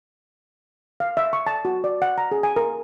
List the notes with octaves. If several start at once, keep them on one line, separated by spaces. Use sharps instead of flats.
F5
E5
C#6
A5
F#4
D5
F#5
A#5
G#4
G#5
A#4